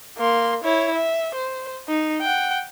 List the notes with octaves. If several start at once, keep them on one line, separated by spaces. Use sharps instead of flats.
A#3 C6
E4 C#5
E5
C5
D#4
F#5 G5